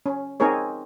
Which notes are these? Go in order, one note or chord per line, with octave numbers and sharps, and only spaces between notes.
C#4
C4 D#4 G#4 A#4 C#5